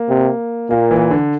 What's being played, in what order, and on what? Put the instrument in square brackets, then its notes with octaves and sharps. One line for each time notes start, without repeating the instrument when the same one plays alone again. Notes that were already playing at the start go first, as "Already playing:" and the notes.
Already playing: [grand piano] A#3
[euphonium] C3
[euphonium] A#2 [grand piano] A#3
[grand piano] E3
D3